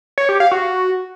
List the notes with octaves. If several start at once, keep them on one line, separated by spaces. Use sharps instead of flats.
C#5
G4
F5
F#4